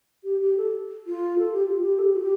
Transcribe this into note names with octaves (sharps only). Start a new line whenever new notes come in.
G4
G4
A4
F4
A4
G4
F4
G4
A4
G4
F4
G4